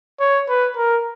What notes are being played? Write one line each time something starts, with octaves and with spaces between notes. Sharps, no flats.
C#5
B4
A#4